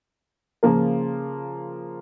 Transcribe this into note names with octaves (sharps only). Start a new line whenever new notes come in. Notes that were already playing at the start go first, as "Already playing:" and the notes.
C#3 F3 A#3 F4 A#4